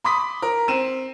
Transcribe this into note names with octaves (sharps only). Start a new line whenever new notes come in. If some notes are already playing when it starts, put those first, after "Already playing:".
B5 C6 D6 D#6 B6
A#4
C4 D#7 E7